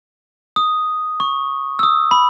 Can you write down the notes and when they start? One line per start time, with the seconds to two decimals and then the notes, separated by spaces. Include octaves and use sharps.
0.56 D#6
1.20 C#6
1.79 E6
1.83 D#6
2.11 B5